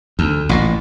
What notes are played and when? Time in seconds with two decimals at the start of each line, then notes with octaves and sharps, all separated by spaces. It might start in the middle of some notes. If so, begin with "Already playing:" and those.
0.19 D2
0.49 A1 A#2